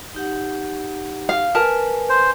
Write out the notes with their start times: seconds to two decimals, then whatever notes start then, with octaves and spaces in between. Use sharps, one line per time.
0.15 D#4 G4 F#5
1.29 F5
1.55 A#4 B4 G#5 A5
2.09 C5